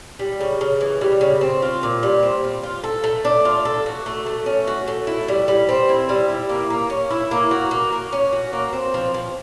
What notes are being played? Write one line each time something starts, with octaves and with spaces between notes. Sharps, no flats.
G3
C#3
C#3
E3
G3
C#3
C4
F4
A#2
G3
C4
F4
F4
A4
A3
D4
F4
A4
F#4
A3
A3
C#4
F#4
A3
E4
G3
G3
C4
E4
G3
E4
A#3
A#3
C#4
E4
A#3
F#4
A#3
A#3
C#4
F#4
A#3
C4
F3
F3